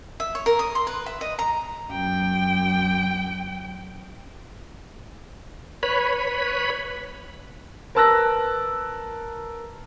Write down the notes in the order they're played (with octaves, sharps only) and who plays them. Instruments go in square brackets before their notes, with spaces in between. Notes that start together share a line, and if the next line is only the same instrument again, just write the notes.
[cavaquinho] E5
C#5
A#4
D#6
C6
B4
E5
D#5
A#5
[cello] F#2 G5
[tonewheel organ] B4 C#5 B5
[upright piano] A#4 B4 A5 E6 F#6 A#6